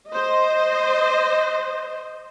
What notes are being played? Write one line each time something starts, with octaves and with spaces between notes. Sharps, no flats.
C5 D#5